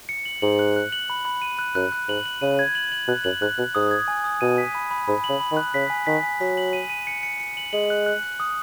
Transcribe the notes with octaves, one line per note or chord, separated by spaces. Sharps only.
C#7
F#7
G#2 F#7
F#6
F#6
F#7
B5
B5
D#7
F#6
F#2 F#6
F#6
G#2 F#7
F#7
C#3 D#7
G#6
F#7
F#7
B2 F#6
F#2 F#7
G#2 F#6
B2 F#6
G#2 D#6
G#6
G#5
D#6
B2 D#7
B6
B5
B5
G#2 B5
F#7
C#3
B5
D#3
F#6
C#3 B6
G#5
D#3 B6
G#5
F#3 B6
F#7
D#7
D#7
C#7
C#7
C#7
F#7
G#3 F#7
F#6
F#6
F#6
D#6